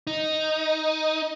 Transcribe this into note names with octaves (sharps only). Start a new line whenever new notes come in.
D#4